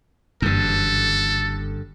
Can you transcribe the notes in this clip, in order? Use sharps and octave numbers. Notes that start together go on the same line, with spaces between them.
F#1 G2 D3 E3 A4